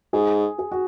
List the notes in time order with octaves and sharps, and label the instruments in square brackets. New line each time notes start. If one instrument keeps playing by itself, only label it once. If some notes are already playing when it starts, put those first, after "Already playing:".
[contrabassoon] G#2 [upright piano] G#4
[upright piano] G#4
F#4